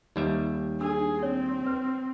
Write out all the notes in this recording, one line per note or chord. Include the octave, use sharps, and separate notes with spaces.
D#2 G3 D#4 E5
D4 G#4 E6
C4 C#5
B4